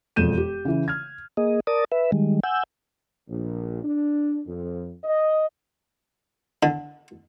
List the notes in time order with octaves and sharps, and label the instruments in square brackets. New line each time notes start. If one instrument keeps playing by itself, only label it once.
[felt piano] E1 F2 G6 D#7 E7
G4
C#3 E3
F6 G#6
[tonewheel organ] A#3 G#4 D#5
A#4 D5 A5 D#6
B4 E5
D#3 G3 G#3
F#5 G#5 E6 G6
[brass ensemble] A#1
D4
F2
D#5
[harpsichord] D3